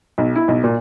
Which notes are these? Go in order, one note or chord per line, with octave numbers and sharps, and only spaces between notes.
B1
E4
B1
A#2